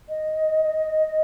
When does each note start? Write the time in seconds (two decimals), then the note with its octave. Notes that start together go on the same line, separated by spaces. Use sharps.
0.09 D#5